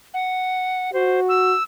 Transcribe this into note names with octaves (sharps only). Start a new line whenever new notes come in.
F#5
F#4 C5
E6